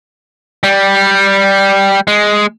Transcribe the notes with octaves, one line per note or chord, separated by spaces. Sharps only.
G3
G#3